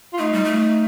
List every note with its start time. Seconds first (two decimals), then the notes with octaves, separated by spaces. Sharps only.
0.13 F4
0.18 A3 D#4
0.32 G3
0.44 A3